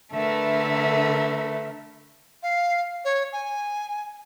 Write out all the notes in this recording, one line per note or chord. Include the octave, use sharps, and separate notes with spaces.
D3 A3 A#4 B4 E5
F5
C#5
G#5